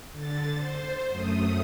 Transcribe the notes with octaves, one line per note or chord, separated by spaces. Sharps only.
D3 A6
C5
F#2 A3 D#6